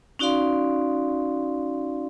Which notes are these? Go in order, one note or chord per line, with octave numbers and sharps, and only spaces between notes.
C#4 D#4 F#4 D5 F5 C6